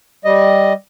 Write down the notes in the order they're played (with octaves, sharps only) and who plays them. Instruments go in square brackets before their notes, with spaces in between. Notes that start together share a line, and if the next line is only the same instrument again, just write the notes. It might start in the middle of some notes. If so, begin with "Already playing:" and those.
[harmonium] G3 D#5